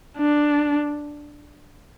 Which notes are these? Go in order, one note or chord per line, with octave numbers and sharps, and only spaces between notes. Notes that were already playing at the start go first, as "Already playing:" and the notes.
D4